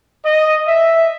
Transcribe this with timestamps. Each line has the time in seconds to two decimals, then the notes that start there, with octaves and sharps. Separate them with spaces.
0.24 D#5
0.67 E5